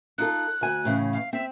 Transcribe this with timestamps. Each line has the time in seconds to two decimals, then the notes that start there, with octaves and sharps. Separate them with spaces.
0.18 D#4 F4 A4 F#6
0.61 D2 G#5
0.85 A2 C#3 E3
1.13 F5
1.33 C4 E5